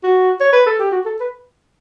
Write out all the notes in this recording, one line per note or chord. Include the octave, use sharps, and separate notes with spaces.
F#4
C#5
B4
A4
G4
F#4
A4
B4